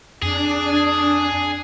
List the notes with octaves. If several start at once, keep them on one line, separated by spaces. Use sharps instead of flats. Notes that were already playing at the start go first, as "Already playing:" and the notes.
F2 D4 G#4